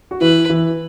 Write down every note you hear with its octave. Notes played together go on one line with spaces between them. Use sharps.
F#4
E3 E4 B4
E3 E4